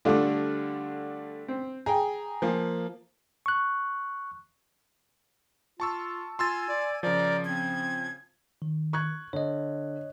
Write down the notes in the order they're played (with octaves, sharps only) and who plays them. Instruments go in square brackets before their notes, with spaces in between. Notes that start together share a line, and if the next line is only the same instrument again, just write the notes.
[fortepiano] D3 A3 F4 [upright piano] G3 D4
[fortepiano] C4
[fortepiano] G#4 G5 [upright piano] A#5
[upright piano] F3 A#3
[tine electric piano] C#6 F#6
[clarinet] F4 [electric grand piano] A5 C#6 E6
[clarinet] F4 [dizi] G#5 [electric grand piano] C6 E6 A6
[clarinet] D5
[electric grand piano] C#3 F3 [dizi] A#4 [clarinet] D5
[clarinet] C4 [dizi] G#6
[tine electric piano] D#3
[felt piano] C#6 F#6 G#6
[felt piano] D3 [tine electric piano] C#5 D#5